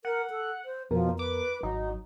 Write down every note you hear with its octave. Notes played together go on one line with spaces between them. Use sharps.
A#4 F#5
A4
C5
F2 B2 F3 B3 A#4
B4 D6
G#1 F#3 D#4